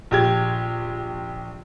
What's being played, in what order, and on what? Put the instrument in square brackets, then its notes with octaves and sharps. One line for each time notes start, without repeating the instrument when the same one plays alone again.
[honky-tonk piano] A#1 G4 G#6